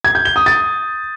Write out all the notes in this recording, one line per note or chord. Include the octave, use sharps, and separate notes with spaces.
G#6
G6
G7
D#6
A6